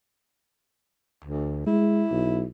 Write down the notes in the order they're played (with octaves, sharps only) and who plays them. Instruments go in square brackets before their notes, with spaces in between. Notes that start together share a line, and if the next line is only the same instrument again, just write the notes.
[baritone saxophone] D2
[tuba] G#3 [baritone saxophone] E4
[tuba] B1